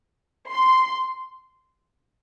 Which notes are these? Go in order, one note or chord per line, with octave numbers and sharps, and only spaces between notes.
C6